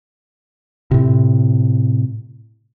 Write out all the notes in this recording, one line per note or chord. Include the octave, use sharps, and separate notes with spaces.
A2 C3